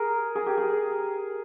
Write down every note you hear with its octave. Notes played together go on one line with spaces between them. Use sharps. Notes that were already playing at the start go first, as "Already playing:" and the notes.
Already playing: G#4 A#4
G#4
G4
G#4